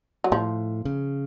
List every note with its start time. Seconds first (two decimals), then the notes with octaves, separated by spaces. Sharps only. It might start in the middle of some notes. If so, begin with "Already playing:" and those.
0.24 F#3
0.32 A2 F3
0.85 C#3